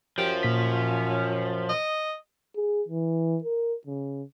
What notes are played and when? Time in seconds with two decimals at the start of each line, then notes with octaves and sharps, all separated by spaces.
0.18 F#2 F3 G4
0.43 A#2 C#4 B6
1.69 D#5
2.56 G#4
2.88 E3
3.44 A#4
3.87 C#3